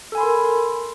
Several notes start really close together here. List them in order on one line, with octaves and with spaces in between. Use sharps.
A4 G#5 B5 C6 A#4